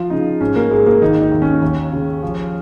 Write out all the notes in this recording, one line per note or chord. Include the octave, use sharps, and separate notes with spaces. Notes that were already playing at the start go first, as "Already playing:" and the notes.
Already playing: F3 F4
C#3 D#4
G#2 C#4
A#3
G#2 G#3
A#3
D#3 D#4
D#4
D#2
C#4
D#2
C#3
F3